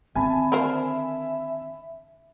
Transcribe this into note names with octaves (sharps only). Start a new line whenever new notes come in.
D#3 C4 E5 G#5 A5 B5
D3 A#4 C5